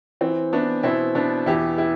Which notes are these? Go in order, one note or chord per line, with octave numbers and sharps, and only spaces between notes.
E3 C4
E3 B3 D4
B2 C4 E4
B2 B3 D4
E2 E4 G4
E4 G4